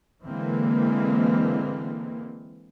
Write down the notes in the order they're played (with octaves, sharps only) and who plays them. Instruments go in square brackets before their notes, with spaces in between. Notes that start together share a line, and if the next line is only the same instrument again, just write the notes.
[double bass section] D3 E3 G#3 A#3 C4